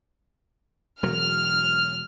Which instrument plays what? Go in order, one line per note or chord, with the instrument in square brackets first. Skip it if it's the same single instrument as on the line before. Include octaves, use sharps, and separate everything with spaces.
[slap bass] E1 F#3 [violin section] F6